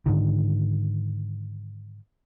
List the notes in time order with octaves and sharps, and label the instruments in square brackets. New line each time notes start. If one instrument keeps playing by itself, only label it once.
[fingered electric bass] G#2 D3 D#3